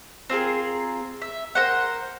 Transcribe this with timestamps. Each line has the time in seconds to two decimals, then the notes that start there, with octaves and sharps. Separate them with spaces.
0.30 C4 F4 G#4 A#4
1.22 E5
1.55 A#4 C5 F#5